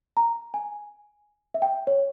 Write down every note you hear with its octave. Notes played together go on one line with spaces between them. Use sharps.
A#5
G#5
E5
G5
C#5